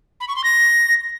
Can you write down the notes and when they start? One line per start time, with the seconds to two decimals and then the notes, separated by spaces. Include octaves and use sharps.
0.20 B5
0.28 C#6
0.36 C6
0.44 A#6